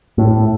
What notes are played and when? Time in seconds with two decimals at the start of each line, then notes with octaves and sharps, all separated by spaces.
0.18 A2